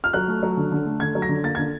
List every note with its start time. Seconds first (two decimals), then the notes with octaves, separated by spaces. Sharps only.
0.04 F6
0.13 F#3 F#6
0.28 A3
0.43 F#3
0.57 D3
0.72 D3
0.86 A3
1.00 D3 G#6
1.15 F#3
1.22 A#6
1.29 D3
1.44 A#3 A6
1.55 D3 G#6